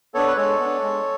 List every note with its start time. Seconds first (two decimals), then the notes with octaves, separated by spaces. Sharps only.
0.14 B3 D4 A4 C#5
0.27 B4
0.37 G#3 A4 C#5
0.59 B3 D4
0.82 G#3